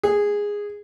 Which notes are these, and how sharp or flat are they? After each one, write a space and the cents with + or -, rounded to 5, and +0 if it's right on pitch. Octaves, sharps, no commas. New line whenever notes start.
G#4 -10